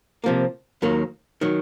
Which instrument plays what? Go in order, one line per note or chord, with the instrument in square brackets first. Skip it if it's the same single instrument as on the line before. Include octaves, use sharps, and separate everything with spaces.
[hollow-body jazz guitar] C3 F3 A#3
D#2 D#3 F#3 A#3
D#3 F#3